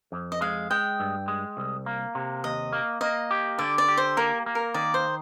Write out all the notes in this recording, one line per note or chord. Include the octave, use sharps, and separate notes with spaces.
F2
D#5
G#3 F5
G#3 G5
G2
G#3
C2
A#3
C3
D#2 D#5
A#3
A#3 D#5
G4
D3 D5
D5
G4
C5
A#3 A#4
A#3
A#4
D#3 D5
C5